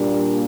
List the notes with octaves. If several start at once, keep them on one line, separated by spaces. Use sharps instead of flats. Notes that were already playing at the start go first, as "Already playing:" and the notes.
Already playing: A#2 G3 A#3 D4